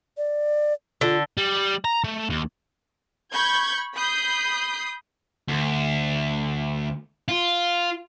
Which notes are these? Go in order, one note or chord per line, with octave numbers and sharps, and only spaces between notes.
D5
D3 F4
G3
A#5
A3
D#2
B5 C#6 G6 G#6
B5 D#6 G6 C7
D2
F4